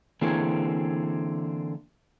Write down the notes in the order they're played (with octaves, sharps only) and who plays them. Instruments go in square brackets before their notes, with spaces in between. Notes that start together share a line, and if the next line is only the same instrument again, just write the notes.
[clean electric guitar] D3 E3 A#3 C4 G#4 C#5